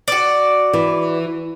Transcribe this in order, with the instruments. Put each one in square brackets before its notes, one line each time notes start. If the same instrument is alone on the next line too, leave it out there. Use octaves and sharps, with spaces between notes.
[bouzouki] F#4 D5
[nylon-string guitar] E3